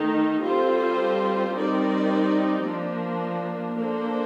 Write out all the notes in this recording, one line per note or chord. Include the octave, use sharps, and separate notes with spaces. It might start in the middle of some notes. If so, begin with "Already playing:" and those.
Already playing: D#3 A3 D#4
G3 C4 F4 A4 C5
G3 C4 D#4 A#4 D5
F3 A#3 D4
A#3 D4 A4 C5